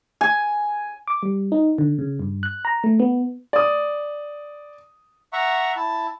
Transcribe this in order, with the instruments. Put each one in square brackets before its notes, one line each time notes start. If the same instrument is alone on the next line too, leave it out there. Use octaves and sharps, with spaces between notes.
[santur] G#5
[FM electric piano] D6
G3
D#4
D3
C#3
G2
F#6
A#5
A3
B3
[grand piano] D5 D#6
[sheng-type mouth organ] E5 F#5 A#5 C#6
E4 A5